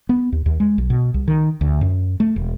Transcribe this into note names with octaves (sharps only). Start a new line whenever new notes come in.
B3
D#2
D#2
G#3
B1
B2
C2
D#3
D2
F#2
A3
E1